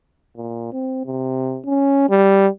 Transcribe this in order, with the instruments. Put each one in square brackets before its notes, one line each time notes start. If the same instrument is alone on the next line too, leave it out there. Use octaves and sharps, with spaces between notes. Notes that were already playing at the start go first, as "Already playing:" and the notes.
[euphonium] A#2
C4
C3
C#4
G3